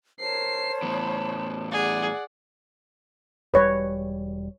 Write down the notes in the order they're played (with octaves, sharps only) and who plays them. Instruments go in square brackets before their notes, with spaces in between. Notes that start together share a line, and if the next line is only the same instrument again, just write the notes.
[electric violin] A#4 C7 [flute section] C5 C#5 A5
[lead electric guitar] E2 A2 [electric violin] B5
[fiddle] G#4 [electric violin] D5 F#5
[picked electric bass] E1 G3 [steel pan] B4 C#5